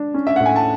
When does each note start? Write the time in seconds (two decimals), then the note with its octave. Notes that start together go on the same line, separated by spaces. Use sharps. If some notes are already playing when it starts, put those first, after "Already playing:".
Already playing: D4
0.14 C#4
0.27 E5
0.36 A2 F#5
0.46 G#5
0.56 A5